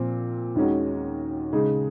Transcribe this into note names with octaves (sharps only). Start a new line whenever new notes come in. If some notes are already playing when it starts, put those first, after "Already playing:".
Already playing: A#2 F3 C4
D#2 D#3 G#3 C#4 F#4
C#3 G#3 D#4 G#4